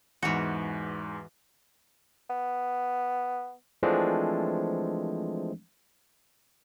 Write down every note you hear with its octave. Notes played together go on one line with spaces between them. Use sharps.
E2 G#2 E3 F#4
B3
E3 F3 G#3 A3 C4 D4